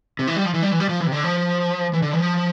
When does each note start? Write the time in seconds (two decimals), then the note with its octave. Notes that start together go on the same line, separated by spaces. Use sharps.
0.19 C3
0.27 E3
0.36 G3
0.45 F3
0.54 E3
0.62 G3
0.72 E3
0.80 G3
0.89 F3
1.00 E3
1.07 C3
1.12 D3
1.24 F3
1.93 E3
2.02 D3
2.13 E3
2.20 F3